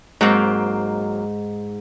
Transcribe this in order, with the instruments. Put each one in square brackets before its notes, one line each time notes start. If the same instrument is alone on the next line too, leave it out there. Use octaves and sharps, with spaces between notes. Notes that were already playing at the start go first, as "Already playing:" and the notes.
[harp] G#2 [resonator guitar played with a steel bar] F#3 A#3 C4